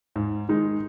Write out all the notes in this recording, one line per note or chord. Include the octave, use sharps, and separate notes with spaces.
G#2
D#3 G#3 D#4